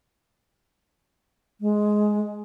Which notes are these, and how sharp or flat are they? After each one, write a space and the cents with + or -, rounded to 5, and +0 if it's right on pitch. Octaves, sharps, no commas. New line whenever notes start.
G#3 +10